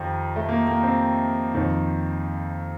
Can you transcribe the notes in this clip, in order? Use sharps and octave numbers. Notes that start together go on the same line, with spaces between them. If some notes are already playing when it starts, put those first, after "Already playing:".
Already playing: F2 D#3 G4
A3
A#3
A#3
C4
F2 D#3